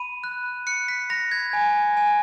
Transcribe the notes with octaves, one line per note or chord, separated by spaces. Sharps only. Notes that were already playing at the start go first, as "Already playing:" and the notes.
Already playing: B5 D#7
F#6
F#6 C#7
B6
B5 A#6
G#6
G#5
G#5